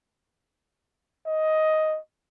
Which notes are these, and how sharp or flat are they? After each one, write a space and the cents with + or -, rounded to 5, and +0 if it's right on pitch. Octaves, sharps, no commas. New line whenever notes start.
D#5 +10